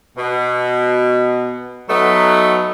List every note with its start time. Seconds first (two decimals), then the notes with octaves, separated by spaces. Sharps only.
0.16 B2
1.89 F#3 A3 B3 D#4